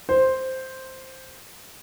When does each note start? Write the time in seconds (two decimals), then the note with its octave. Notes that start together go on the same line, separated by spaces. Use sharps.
0.09 C5